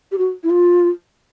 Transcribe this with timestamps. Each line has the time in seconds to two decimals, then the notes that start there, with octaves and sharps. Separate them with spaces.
0.12 G4
0.18 F#4
0.43 E4
0.50 F4